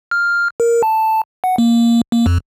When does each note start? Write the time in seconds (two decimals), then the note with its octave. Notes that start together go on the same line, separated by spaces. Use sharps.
0.11 F6
0.60 A#4
0.83 A5
1.44 F#5
1.58 A#3
2.12 A#3
2.26 F2